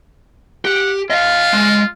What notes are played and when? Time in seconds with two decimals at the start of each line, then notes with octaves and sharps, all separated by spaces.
0.65 G4 F#5
1.10 F4 D#5 F5
1.53 G#3